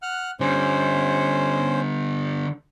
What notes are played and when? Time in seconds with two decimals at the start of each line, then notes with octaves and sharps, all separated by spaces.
0.02 F#5 F6 F#6
0.40 D3 G3 C#4 C5